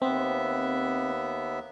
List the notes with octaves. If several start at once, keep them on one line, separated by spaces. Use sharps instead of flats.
D#2 B3 C4 E5